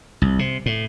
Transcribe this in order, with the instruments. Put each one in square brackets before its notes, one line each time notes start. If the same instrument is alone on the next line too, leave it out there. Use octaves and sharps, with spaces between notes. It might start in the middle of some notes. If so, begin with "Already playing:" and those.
[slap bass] C2
C3
A2